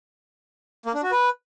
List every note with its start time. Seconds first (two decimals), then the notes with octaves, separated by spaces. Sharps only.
0.86 A#3
0.94 D4
1.03 F#4
1.11 B4